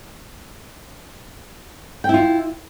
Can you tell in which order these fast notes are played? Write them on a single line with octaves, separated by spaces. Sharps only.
G5 E4 F4